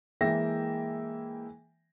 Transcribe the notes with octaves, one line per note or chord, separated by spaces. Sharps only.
E3 G#3 A#3 E5 G5 A#6